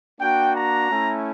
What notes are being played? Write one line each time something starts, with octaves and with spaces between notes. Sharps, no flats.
A#3 D4 F#4 G5
A#5
A3 C#4 E4